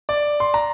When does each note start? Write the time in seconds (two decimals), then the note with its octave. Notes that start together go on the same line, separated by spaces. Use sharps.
0.09 D5
0.40 C6
0.54 A#5